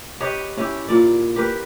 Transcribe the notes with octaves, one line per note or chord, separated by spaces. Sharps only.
G4 B4 C#5 D#5
C#4 E4 G4
A#2 D5
G4 A#4 B4